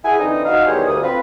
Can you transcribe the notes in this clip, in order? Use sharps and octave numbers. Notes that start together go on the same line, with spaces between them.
E4 G#4 F#5 G#5
D3 E3 C4 D4 D#4
D#4 F#4 D#5 F5
E2 D#3 G3 G#4 C5 C#5
D2 G2 D#6
C4 F4 B4